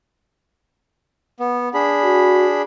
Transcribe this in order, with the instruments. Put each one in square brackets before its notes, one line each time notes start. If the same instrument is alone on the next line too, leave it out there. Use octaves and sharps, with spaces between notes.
[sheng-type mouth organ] B3
D4 G#4 B5
[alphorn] F#4